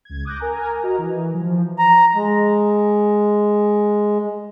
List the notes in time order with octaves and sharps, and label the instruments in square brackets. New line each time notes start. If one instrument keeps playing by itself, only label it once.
[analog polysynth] C#2 G#6
D6 D#6 F#6 G6 A#6
A#4 G#5 A#5
F#4 D#5 A#5
E3
F3
[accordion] A#5
G#3